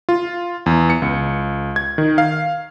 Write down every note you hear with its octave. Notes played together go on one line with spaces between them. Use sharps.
F4
E2
C#7
C#2
G#6
D#3
F5